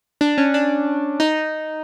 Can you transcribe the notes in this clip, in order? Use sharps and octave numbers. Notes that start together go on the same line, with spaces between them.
D4
C#4
D4
D#4